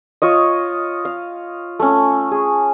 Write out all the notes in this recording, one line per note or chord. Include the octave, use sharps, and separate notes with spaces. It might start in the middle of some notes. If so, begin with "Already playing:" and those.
F4 C#5 D#5
F5
A3 C#4
G#4